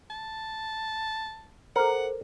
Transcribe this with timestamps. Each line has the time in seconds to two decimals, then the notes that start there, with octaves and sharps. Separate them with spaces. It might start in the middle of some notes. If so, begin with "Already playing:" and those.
0.10 A5
1.76 A4 A#4 C5 F#5